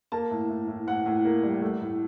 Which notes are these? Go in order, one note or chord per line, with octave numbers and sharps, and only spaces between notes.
A#3 A5
A2
A2
A2
A2 F#5
A2
A#3
G3
A3
A2